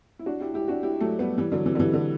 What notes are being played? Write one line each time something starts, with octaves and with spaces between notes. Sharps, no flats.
E4
D4 F#4
E4 G4
E4 G4
D4 F#4
E4 G4
F#3 A3
G3 B3
E3 G3
D3 F#3
C3 E3
D3
C3 E3
D3